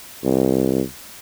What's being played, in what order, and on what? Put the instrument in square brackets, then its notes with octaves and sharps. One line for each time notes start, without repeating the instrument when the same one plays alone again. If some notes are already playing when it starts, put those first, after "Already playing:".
[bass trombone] C2